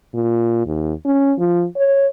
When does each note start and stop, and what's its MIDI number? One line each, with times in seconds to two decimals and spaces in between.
0.14 0.63 46
0.66 0.93 39
1.05 1.33 61
1.38 1.65 53
1.76 2.07 73